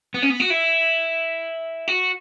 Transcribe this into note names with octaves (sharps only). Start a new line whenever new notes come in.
B3
C#4
B3
F#4
E4
F#4